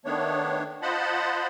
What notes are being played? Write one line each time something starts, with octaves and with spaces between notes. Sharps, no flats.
D#3 A3 B3 D4 C#5
F4 C5 D#5 F#5 A5 B5